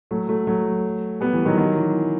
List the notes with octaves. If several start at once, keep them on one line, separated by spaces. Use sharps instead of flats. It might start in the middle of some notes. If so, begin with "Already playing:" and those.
F#3 A3
F#3 A3
F#3 A3
G3 B3
E3
D#3 F#3
D#3 F#3
E3